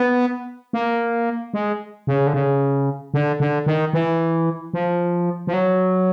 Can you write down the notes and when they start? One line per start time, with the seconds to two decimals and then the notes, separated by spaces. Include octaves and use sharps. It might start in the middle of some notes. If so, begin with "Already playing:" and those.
Already playing: B3
0.73 A#3
1.54 G#3
2.07 C#3
2.27 D3
2.33 C#3
3.14 D3
3.40 D3
3.66 D#3
3.93 E3
4.74 F3
5.47 F3
5.53 F#3